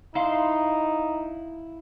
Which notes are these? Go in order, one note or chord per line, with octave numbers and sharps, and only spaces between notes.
D#4 E4 F5 C6